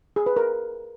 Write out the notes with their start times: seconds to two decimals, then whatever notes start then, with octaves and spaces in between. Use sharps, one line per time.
0.16 G#4
0.26 B4
0.36 A#4